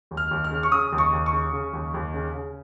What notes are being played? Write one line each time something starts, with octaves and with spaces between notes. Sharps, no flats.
D#2
F6
D#2
F6
C#3
C#6
C#3 D#6
D#2
C#6
D#2
C#6
C#3
C#3
D#2
D#2
C#3
C#3